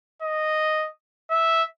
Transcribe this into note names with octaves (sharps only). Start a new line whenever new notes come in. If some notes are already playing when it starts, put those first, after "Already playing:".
D#5
E5